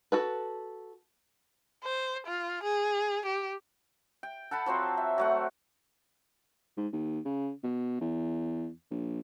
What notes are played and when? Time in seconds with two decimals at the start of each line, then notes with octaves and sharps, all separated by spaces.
0.12 F#4 A4 B4
1.84 C5
2.27 F4
2.63 G#4
3.26 G4
4.23 G5
4.51 A4 F#5 A5 B5
4.66 F3 F#3 C4 C5
4.97 E5
5.18 F#3 A3 F#5
6.77 G#2
6.93 D#2
7.25 C#3
7.64 B2
8.01 E2
8.91 A#1